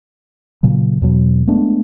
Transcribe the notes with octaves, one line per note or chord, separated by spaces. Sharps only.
A#2 C#3 F#3
E2 B2 F#3
G#3 A3 B3 D4